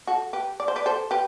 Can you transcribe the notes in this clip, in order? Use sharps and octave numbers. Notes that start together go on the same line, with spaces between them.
F#4 A4
G4 B4
D5
C5
B4 D5
A4 C5
G4 B4